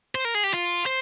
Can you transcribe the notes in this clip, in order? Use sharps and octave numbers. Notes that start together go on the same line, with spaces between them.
C5
A#4
G#4
G4
F4
C5